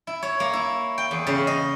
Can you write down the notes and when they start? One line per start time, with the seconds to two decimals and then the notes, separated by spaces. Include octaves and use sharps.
0.07 E4
0.23 C#5
0.40 A#3
0.53 E4
0.98 G5
1.11 E2
1.27 C#3
1.47 D#5